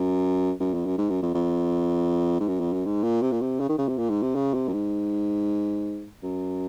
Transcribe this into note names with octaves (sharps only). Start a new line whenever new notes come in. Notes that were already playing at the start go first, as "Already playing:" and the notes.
Already playing: F#2
F#2
F2
F#2
G#2
F#2
F2
F2
G#2
F#2
F2
F#2
G#2
A#2
C3
A#2
C3
C#3
D#3
C#3
C3
A#2
G#2
C3
C#3
C3
F#2
G#2
F#2